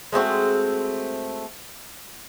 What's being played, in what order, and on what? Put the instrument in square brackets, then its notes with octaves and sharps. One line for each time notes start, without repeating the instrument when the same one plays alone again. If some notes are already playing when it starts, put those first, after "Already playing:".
[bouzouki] G#3 A3 C4 F#4